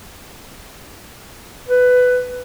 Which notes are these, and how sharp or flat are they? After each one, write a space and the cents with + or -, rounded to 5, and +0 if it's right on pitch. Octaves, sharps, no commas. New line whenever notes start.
B4 +10